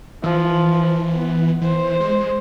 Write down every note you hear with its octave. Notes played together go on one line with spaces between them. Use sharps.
E3 F3
B3
E3 C5
G#3